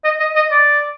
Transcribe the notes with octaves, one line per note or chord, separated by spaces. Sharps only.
D#5
D#5
D#5
D5